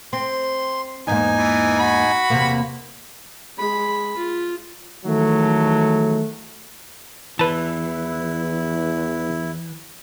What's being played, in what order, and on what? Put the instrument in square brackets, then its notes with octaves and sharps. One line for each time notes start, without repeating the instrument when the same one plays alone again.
[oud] C4 [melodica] C6
[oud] E2 G#2 A#3 [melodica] D#4 G#5
[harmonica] E3
F#4 B5
[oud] E2 C3 A#3
[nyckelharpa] G#3 B5
F4
[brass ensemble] D#3 E3 F#3 G#3 A3
[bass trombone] E2 [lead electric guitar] E3 [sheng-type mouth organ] E4 [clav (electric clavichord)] B4 A5